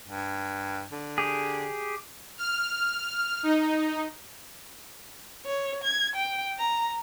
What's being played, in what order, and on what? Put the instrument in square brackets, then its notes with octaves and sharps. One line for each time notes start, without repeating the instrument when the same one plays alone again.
[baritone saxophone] G2
D3
[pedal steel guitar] G4 G#4
[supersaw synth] F6
D#4
[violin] C#5
G#6
G5
A#5